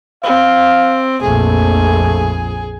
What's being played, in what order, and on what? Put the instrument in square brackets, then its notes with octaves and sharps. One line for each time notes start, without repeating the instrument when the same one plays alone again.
[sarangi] C4 [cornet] F5
[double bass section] A#1 F2 [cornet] A3 [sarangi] G#4